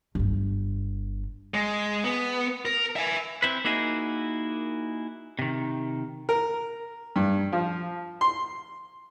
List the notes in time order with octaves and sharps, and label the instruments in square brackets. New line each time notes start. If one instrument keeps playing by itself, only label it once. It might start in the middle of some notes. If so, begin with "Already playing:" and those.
[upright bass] G1 G2
[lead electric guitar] G#3
B3
A#4
E5 G#5
[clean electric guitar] C4 E4 B4
A#3 D#4 E4 F#4 G#4
C3 D#3
[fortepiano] A#4
G2
F3
C6